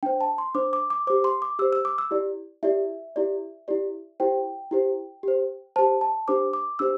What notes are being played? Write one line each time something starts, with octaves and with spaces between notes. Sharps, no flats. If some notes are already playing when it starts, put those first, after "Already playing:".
D4 C5 G5
A5
C6
D4 C5 D6
D6
D6
G4 C5 D6
C6
D6
G4 C5 E6
E6
D6
E6
E4 G4 D5
E4 G4 D5 E5
E4 G4 D5
E4 G4 D5
E4 G4 C5 G5
E4 G4 C5
G4 C5
G4 C5 A5
A5
D4 G4 C5 D6
D6
D4 G4 C5 E6